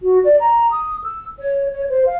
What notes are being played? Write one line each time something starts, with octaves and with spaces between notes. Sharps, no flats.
F#4
D5
A#5
D#6
E6
C#5
C#5
C5
F5